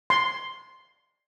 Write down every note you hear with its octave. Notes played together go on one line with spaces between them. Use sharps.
C6